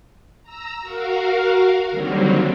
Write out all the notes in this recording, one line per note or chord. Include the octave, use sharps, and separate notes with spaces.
A#5 E6
F#4 A#4 F5
D3 D#3 F#3 G3 A#3 C4